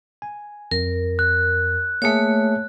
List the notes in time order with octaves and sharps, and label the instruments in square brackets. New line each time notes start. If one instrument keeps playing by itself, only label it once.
[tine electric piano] G#5
[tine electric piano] F2 [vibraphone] A#4
[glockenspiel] F#6
[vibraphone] A3 C#5 [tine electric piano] A#3 G#4 E5